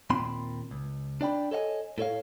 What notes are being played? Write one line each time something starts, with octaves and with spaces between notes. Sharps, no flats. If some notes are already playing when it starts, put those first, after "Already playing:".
D#2 A#2 C4 B5 C6
C#2
D4 D5 G5 B5
A4 C#5 D#5 F5 G#5
A2 A4 C#5 F5